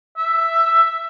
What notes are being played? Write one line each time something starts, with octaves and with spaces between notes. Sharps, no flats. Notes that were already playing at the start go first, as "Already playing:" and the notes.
E5